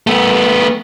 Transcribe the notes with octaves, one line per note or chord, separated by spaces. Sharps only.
A3 B3